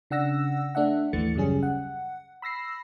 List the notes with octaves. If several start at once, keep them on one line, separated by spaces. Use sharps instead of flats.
C#3 D4 F#5 E6 A#6
A3 D4 E5 F#5
G#1 D#2 E3 A3 A6 C#7
F#2 C#3 G3 C#4 G#4
F#5
B5 E6 A#6 C7